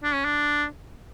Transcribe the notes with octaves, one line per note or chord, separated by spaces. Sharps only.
D4
C#4
D4